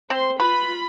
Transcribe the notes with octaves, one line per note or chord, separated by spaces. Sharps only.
C4 C5 C6
F4 B4 B5